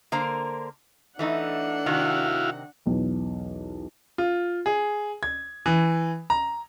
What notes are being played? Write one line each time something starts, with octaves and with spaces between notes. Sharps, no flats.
D3 A#3 A#4 C5
E3 A3 D4 D#4 F#5
C3 D#3 E4 F#4 F5
B1 E2
F4
G#4
G#6
E3
A#5